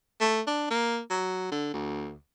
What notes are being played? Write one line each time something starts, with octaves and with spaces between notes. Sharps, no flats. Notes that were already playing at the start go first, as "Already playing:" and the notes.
A3
D4
A#3
F#3
D3
D2